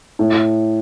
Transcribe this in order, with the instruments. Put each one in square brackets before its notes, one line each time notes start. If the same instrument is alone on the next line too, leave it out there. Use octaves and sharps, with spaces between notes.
[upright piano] A2